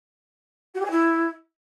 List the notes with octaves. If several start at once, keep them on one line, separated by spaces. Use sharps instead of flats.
F#4
G4
G#5
E4